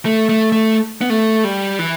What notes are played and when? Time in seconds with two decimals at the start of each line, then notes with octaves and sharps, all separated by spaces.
0.05 A3
0.29 A3
0.52 A3
1.01 B3
1.10 A3
1.44 G3
1.79 E3